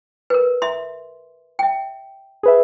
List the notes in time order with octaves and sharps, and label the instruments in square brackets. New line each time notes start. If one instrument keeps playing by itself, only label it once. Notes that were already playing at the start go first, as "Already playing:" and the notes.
[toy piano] A#4 B4
E5 C6
E5 G5
[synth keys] G#4 B4 E5